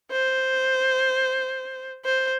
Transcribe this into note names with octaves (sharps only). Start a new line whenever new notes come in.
C5
C5